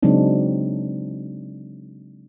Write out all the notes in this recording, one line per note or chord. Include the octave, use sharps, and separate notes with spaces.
C#3 F#3 G#3 C4 D4 D#4